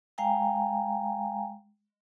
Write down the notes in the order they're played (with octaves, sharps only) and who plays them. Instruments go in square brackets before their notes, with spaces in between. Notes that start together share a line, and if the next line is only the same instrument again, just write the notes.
[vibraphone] G#3 F5 G5 G#5 A#5